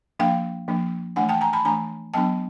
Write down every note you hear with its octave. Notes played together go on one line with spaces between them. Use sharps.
F3 A#3 D4 F5 G5
F3 A#3 D4
E3 A3 D4 F#5 G#5
G5 A5
G#5 A#5
A5 B5
E3 A3 D4 G#5 A#5
F#3 B3 D4 G5 A5